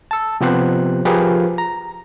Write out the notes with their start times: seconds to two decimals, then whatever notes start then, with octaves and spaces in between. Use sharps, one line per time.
0.11 A5 E6
0.41 C3 F3 B3 G4 C5 F#6
1.05 F3 G4 G#4 A#4 B4 F5
1.58 A#5